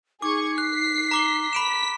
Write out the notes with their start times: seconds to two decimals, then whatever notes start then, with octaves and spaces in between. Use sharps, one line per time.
0.22 D#4 G#4 C#6 D6 G#6
0.58 F#6 B6 C7
1.11 A#5 D6 G7
1.53 B5 B6 D7 E7